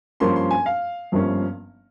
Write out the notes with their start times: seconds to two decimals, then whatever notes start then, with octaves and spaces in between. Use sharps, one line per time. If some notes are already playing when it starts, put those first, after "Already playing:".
0.20 G2 F3 A#3 C#4 C6
0.36 C6
0.51 G#5
0.66 F5
1.12 G1 G2 F3 A#3 C#4